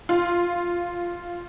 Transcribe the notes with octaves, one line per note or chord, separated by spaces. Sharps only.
F4